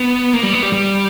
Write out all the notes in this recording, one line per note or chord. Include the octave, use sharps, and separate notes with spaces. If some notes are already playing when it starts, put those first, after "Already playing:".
Already playing: B3
A#3
G3
B3
G3
G3